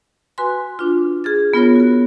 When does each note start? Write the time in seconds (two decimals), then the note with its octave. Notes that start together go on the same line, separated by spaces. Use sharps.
0.38 F#4 B4 G#5 C6
0.79 D4 F4
1.24 G#4 F6 A6
1.54 B3 F4 A#4 C#5
1.75 F#4 A#4